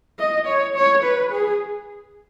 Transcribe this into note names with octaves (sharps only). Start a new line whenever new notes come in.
D#5
C#5
C#5
B4
G#4